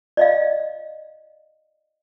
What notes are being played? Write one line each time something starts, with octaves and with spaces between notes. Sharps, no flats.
D5 D#5 F5